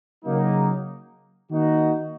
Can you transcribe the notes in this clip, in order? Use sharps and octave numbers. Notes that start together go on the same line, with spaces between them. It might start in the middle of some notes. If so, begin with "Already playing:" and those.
C#3 F#3 A#3 D#4
D#3 A#3 D#4 F#4